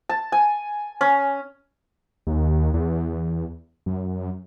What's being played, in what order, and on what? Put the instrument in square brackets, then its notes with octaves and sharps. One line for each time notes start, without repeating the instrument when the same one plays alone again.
[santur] A5
G#5
C#4
[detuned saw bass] D#2
E2
F#2